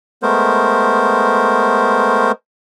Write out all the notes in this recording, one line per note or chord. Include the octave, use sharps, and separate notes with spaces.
G#3 A3 B3 A#4 C5